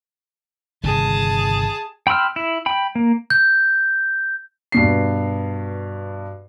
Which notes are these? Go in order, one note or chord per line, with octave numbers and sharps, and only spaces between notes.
G1 C3 D#3 G#4 A5
G5 B5 C6 E6 F6
E4
G5 B5
A#3
G6
G2 B2 C7